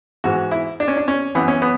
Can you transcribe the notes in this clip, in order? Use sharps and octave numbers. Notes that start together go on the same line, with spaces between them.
G#2 E3 F#4
E4
D4
C#4
D4
C#4
F#2 E3 B3
C#4
B3